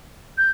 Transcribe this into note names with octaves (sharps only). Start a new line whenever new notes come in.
G6